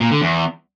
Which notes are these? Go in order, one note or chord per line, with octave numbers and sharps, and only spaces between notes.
A#2
D3
E2